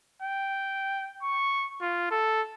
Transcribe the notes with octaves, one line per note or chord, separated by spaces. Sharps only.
G5
C#6
F4
A4